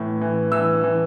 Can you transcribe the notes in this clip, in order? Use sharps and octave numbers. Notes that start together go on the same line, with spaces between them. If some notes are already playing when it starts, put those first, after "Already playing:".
Already playing: A2 E3
E3
E3 E6
E3